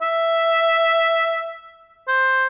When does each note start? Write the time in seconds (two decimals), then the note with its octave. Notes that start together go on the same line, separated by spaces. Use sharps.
0.01 E5
2.08 C5